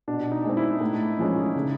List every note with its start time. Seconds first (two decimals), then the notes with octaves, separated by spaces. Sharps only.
0.08 B2 D4
0.32 D#4
0.45 G#3 C4
0.57 E4
0.81 A2
1.18 F3 G#3 C#4
1.55 C#3